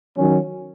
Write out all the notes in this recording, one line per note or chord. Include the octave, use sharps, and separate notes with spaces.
D#3 F#3 C#4